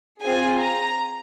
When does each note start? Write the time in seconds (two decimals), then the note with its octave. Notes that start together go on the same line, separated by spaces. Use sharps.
0.22 C4 F4 G#4 G#5
0.60 A#5